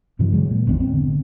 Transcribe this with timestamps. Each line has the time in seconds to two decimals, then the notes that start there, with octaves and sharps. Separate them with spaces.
0.19 G2 C3 E3 F#3
0.33 D3 F#3 G#3
0.51 A#2
0.67 G#1 E2 B3 D4
0.80 C4
0.94 D3